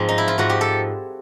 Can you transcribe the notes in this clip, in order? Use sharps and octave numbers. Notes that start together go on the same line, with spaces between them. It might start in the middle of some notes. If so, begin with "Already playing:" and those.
Already playing: G#2 F3 C4
D#4
E4
F4
G#2 F3 F#4
G4
A4